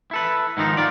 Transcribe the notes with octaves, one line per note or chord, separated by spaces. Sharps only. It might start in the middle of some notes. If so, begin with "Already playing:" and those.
E4 A4 B4
G#2 D#3 F3 D#4
F4 D5